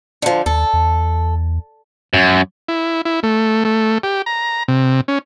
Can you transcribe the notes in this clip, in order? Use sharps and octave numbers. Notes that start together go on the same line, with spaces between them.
D3 F3
D#2 A4
E2
F#2
E4
E4
A3
A3
G4
A#5
C3
C#4